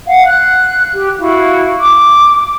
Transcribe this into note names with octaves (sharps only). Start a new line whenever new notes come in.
F5 F#5
F#6
G4
E4 F#4 F5
D6